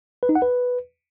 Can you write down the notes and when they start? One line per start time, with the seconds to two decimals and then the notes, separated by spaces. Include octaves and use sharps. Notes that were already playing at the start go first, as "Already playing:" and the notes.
0.23 B4
0.29 D#4
0.35 F#5
0.42 B4